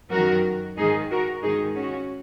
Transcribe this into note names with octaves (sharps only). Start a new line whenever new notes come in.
F#2 D#3 F#4 A#4
G#2 D#3 D#4 G#4
F#4 A#4
G#2 D#3 D#4 G#4
C#4 F#4